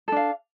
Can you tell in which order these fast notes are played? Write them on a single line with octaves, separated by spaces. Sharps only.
A4 D4 F5